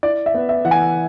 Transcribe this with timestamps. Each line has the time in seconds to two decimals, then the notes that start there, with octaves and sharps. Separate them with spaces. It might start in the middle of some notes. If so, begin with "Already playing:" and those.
0.03 E4 D5
0.26 E5
0.34 B3
0.49 E5
0.65 E3 F#5
0.71 G#5